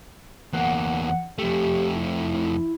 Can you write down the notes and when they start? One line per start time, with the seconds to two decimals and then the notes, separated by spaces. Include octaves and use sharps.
0.53 E2 A#3 F#5
1.38 F2 A3 G4
1.96 E4